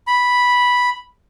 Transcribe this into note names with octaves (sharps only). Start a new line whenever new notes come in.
B5